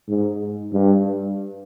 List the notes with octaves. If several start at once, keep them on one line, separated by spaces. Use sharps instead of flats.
G#2
G2